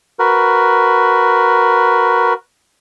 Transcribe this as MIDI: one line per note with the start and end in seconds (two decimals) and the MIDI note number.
0.19 2.34 66
0.19 2.34 70
0.19 2.34 71